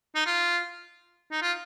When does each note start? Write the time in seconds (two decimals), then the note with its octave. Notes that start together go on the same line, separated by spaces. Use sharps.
0.15 D#4
0.26 F4
1.31 D#4
1.42 F4